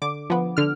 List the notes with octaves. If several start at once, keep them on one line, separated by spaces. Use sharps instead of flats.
D3 D6
F3 B3
D3 F6